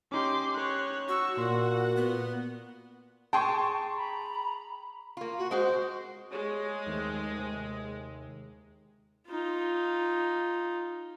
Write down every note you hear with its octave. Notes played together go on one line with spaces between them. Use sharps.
C#4 D#4 G4 C6 D6
C#5 F#6
F#4 C#6 E6
A#2 F#5 C6
B3
G#4 G5 A5 C6 C#6
A#5 B5
A#3 F4
F#4
G#3 F#4 C5
G#3 C#5
D#2 A3 C4
C3
D#4 F4